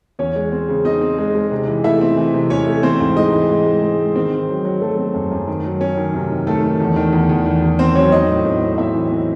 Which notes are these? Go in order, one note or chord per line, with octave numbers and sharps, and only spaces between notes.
E2 C#4 C#5
G#3
C4
C#3
C4 D#4 D#5
C4
G#3
G#3
C3
E3
A3 E4 E5
C4
E3
C3
C3 C#4 C#5
A3
E3 C4 C5
G#2
G#3 D#4 D#5
E3
G#2
G#3
G#3
G#3
D#3 C4 C5
C4
F#3
F#3
F#3 A3 A4
C4
F#2
F#2
D#3
F#3
C#4
D#3
C3
D#3
D#3 A3 A4
D#3
E2
D#3
E2
E2
D#3
E2
D#3 C4 C5
F#3 C#4 C#5
C4 D#4 D#5
A2
A2
C4
D#5
C4 E4 E5
E3
C4